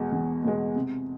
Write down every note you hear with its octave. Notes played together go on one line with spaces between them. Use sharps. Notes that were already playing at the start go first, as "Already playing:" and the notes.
Already playing: E2 B2 G#3
E2
B2 G#3
C3